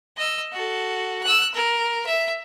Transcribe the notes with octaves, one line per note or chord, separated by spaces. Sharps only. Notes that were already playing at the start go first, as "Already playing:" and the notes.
D#5 E6
F#4 A4
E6 F#6
A#4
E5